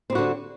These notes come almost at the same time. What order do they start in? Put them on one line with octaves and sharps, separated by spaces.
C4 G3 F#4 D3